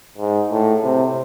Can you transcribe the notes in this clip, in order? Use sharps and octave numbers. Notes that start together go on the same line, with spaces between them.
G#2
A2
C3